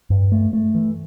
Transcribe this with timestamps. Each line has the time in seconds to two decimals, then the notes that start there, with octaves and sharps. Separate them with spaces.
0.10 G2
0.32 A3
0.53 A3
0.75 E3